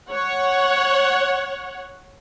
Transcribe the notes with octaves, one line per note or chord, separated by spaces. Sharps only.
C#5 F#5